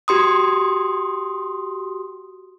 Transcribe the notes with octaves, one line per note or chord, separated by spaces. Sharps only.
F#4 G4 C6 D#6